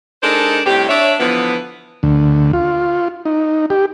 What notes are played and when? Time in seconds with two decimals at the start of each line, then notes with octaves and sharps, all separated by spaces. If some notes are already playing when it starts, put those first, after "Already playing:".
0.23 G#3 D4 D#4 A4 A#4 C5
0.66 A2 C3 G3 G4
0.89 D4 C#5 E5
1.19 D3 E3 F3 B3
2.03 D2
2.53 F4
3.25 D#4
3.70 G4